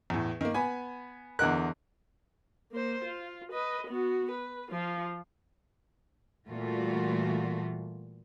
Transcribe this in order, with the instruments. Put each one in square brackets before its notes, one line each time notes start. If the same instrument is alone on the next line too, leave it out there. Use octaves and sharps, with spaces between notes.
[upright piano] E2 A2
D#3 A#3
[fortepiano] B3 [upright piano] G#5 B5
[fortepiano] E2 D3 F#6 [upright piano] A#4 D#5 F#5
[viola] A#3 C5
F4
B4 D#5
B3 F#4
B4
F3 F4
[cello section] A#2 E3 G3 A3 F4 F#4